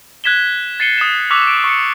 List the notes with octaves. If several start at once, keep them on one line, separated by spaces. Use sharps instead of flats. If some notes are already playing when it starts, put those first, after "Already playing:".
F#6 G#6 B6 E7 G7
A6 C7 C#7 D#7 G7
D#6 E7
C#6 D6 E6 F#6 B6 F7
D7
C#6 C#7